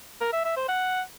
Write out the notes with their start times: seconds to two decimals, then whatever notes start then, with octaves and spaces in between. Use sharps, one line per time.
0.21 A#4
0.33 E5
0.45 E5
0.56 C5
0.68 F#5